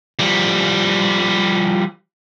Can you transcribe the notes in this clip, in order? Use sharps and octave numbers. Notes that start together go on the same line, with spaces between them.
F3 G3